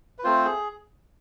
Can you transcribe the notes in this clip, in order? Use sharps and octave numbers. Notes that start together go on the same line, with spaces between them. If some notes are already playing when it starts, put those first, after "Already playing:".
B4
A3 C4 F4 C5
G#4